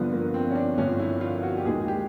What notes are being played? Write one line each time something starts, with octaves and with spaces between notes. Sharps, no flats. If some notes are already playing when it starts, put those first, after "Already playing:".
Already playing: G1 G2 D3 F3 B3
A#3
C4
C#4
D4
G1 G2 D3 F3 C#4
E4
F4
F#4
G4
D#2 D#3 G#3 G#4
G4